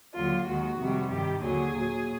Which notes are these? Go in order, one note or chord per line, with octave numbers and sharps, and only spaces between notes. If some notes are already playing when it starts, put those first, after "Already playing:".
D#2 D3 F#3 F4
D#2 D#3 G#3 F#4
F2 C3 D#3 G3
G2 D#3 G3 G4
D#2 D3 F#3 G#4
A#2 F#3